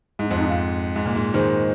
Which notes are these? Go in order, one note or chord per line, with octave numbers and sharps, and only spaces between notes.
G#2 D#4
F2 C4
D#4
F2 F5
G#2
A#2
G#2
D#3 G#3 C5